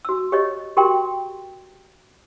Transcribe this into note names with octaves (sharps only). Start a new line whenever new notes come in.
F#4 E6
G4 C#5 D#5
F#4 G4 A#4 G5 C6